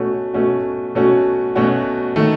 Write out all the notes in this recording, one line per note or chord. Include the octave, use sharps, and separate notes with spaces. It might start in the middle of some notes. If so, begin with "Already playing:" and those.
Already playing: B2 A3 C#4 F#4
B2 A3 C#4 F#4
B2 A3 C#4 F#4
B2 A3 C#4 F#4
D#3 A3